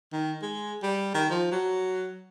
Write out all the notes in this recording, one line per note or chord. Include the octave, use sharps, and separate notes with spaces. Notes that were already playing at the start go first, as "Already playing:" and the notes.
D#3
G#3
G3
D#3
F3
F#3